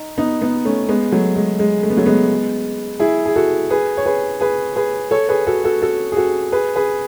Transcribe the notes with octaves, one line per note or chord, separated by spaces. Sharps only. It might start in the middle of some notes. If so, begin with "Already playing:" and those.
Already playing: D#4
B3 D#4
B3 D#4
A3 C#4
G#3 B3
F#3 A3
G#3
G#3
A3
B3
F#3 A3
G#3 B3
E4 G#4
G#4
F#4 A4
G#4 B4
C#5
G#4 B4
G#4 B4
G#4 B4
A4 C#5
G#4 B4
F#4 A4
F#4 A4
F#4 A4
G#4
F#4 A4
G#4 B4
G#4 B4